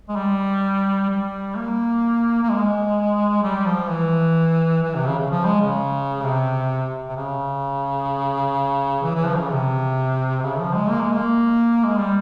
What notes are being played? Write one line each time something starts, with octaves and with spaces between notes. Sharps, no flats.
G#3
G3
G3
A#3
A#3
G#3
G3
F3
E3
E3
C3
C#3
C#3
F3
G#3
C#3
C3
C3
C#3
E3
E3
F3
C#3
C3
C#3
F3
G#3
A#3
G#3
A#3
G#3
G3